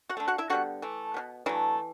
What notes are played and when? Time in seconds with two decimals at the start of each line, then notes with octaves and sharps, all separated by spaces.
0.09 F#4 F#5
0.17 D3 A3
0.28 F#4 F#5
0.38 E4 E5
0.50 D3 G3 B3 F#4 F#5
0.82 E3 A3
1.14 B2 G3 B3
1.46 D3 E3 F#3 A3 E4